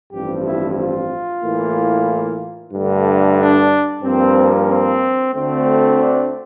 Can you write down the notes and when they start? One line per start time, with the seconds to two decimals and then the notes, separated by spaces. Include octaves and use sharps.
0.11 A1 G2 F3 C4 G4
0.45 E4
0.77 F4
1.42 A2 E3 A#3
2.72 G2 D3 A3
3.38 D4
4.03 G2 F3 A#3 C4
4.68 C4
5.34 D2 D3 A3 C4
5.99 D4